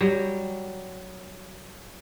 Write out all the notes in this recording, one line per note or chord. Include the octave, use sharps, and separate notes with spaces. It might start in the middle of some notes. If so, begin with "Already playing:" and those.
F#3 G3